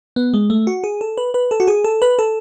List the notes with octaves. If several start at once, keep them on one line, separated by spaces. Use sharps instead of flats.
B3
G#3
A3
F#4
G#4
A4
B4
B4
A4
F#4
G#4
A4
B4
A4